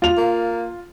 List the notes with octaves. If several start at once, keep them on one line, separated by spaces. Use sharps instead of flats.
F4 F7
A#3